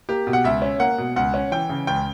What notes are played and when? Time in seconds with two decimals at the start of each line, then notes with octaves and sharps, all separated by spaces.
0.09 A#3 G4
0.27 B2
0.33 F#5
0.44 C#2 E5
0.62 C#4
0.80 A#3 F#5
0.98 B2
1.16 C#2 F#5
1.34 C#4
1.52 E3 G5
1.69 C#3
1.87 C#2 G5